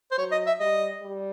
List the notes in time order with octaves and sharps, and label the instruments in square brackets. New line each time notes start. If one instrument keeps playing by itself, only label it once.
[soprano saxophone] C5
[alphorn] F#3 [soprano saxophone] C#5
[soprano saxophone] D#5
E5
[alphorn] G3 [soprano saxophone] D#5
[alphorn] G3